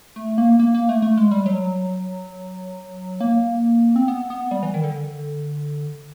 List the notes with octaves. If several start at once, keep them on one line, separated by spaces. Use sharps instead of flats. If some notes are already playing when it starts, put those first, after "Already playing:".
A3
A#3
A#3
A#3
A3
A3
G#3
G3
F#3
A#3
C4
B3
B3
G3
E3
D#3
D3